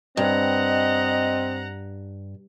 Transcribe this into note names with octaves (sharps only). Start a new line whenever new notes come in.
G2 C4 D#5 F#5 A#5